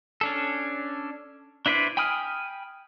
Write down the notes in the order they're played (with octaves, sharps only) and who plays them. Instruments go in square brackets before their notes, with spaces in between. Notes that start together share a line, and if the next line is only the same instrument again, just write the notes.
[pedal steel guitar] C#4 D4 A4
D4 E4 B4 C5 D5
G5 G#5 B5 D#6 F6